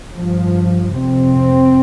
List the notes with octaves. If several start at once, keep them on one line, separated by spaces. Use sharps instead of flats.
G2 F3
F2 C3 C4